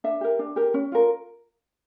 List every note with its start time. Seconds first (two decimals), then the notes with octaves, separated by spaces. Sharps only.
0.04 D4 E5
0.21 G4 A#4
0.39 D4
0.56 G4 A#4
0.74 C#4
0.92 F4 A#4